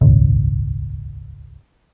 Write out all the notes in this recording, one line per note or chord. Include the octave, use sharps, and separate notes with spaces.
D#1 G#1 C#2